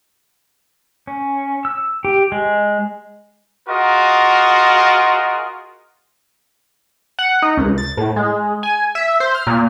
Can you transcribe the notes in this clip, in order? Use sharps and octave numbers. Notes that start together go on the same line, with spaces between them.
C#4
E6
G4
G#3
F4 F#4 G#4 A#4 D#5
F#5
D#4
C#2
A6
A2
G#3
G#5
E5
C5
F6
A#2